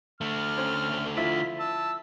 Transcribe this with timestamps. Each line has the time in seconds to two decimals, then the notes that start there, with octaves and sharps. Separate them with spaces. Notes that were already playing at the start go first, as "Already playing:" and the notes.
0.21 D3 A3 F6
0.57 C4 C#4
1.17 F3 E4 F4 B6
1.59 A5 E6